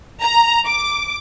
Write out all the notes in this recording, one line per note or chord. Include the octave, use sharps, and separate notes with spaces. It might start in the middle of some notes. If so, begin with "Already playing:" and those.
A#5
D6